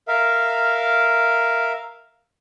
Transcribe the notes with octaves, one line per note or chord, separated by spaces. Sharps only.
A#4 E5 F5